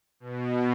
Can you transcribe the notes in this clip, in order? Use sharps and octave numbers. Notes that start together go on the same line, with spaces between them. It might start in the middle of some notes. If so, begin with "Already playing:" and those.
B2